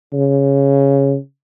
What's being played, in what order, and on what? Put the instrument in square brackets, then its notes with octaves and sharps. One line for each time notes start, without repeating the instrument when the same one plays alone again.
[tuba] C#3